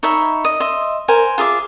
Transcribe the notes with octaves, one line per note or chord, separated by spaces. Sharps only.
D#4 C#5 E5 B5
D#5
D#5 E5 C6
A#4 C5 G#5
F4 G#4 E5 D6